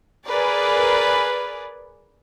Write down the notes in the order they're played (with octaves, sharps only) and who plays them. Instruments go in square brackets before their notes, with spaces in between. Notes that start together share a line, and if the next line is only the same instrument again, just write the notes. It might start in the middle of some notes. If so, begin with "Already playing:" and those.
[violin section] G#4 A#4 B4 D5